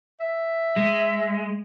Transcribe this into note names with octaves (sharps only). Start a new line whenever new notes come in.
E5
G#3